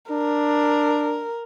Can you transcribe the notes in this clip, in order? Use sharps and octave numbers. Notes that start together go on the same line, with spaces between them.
D4 A#4